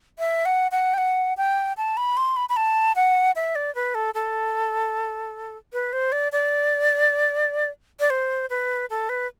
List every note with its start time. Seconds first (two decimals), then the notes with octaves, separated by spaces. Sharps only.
0.19 E5
0.45 F#5
0.71 F#5
0.94 G5
0.98 F#5
1.37 G5
1.77 A5
1.97 B5
2.17 C6
2.36 B5
2.49 B5
2.56 A5
2.96 F#5
3.36 E5
3.55 D5
3.75 B4
3.95 A4
4.14 A4
5.73 B4
5.93 C5
6.12 D5
6.32 D5
8.00 D5
8.10 C5
8.50 B4
8.90 A4
9.09 B4